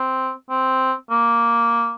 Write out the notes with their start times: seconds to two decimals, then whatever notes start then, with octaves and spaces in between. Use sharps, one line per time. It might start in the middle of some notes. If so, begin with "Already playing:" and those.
Already playing: C4
0.50 C4
1.10 A#3